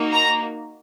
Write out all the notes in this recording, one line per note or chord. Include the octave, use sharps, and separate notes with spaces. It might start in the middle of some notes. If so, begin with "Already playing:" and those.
Already playing: A#3 D#4 F#4
A#5